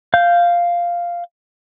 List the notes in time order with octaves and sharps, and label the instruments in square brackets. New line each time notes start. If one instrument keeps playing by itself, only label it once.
[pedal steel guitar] F5 G6